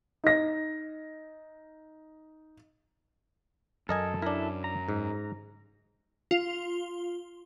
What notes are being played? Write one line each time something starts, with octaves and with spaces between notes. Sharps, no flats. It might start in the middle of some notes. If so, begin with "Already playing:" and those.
D#4 A#6
F#2 A4 A#4 D#5 G#5
D4 E4 A4 A#4
A#5
G#2
F4